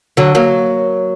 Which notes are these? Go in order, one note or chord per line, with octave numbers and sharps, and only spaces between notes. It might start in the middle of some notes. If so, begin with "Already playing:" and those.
D3 F#3
F#3 A#3